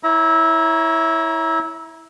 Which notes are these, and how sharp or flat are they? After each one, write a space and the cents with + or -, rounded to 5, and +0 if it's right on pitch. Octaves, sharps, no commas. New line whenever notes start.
E4 -10 C#5 +0 A#5 +25